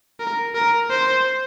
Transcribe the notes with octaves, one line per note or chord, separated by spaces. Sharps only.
A#4
A#4
C5